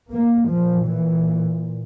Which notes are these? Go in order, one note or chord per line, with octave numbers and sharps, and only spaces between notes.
A#3
A#2 F3
E3